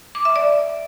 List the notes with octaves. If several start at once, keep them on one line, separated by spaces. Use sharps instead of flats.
D6
E5
D5